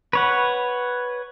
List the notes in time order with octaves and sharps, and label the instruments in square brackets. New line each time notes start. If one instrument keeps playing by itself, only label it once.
[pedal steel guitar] B4 C#5 F#5